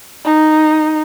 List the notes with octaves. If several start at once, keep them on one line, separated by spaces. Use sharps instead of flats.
D#4